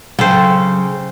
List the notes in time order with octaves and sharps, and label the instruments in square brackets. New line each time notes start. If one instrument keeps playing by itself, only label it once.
[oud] C#3 [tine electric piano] F#3 [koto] A4 C5 [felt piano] G5